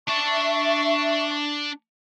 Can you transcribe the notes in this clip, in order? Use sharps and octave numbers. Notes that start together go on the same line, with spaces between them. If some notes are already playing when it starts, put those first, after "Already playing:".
D4 E5 A5 C#6